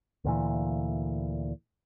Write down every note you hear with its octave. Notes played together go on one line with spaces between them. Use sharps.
D2 A#2 E3